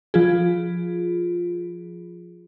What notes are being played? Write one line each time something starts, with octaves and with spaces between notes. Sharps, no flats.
F3 F4 G#4